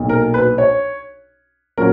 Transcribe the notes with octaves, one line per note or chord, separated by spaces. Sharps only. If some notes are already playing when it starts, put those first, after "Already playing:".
Already playing: B1 A#2 F#3
A#4
B4
C#5
A#2 F#3 C#4 F4 A#4